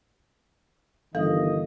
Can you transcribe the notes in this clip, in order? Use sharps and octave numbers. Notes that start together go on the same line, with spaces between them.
G1 D#3 E3 A4 D#5 F5